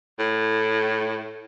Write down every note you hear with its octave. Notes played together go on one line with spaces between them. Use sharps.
A2